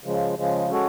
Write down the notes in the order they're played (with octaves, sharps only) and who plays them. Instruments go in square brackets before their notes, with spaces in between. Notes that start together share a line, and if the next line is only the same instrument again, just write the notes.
[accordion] C#3 F3 G#3
C#3 F3 G#3
G#3 C#4 F#4 A4 C#5